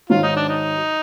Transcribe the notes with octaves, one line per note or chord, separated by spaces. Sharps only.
G#2 D#3 F#3 F4
D#4
D4
D#4